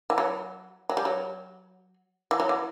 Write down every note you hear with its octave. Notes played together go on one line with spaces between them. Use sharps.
E3
F#3
F#3
G3
F#3
E3
F#3
E3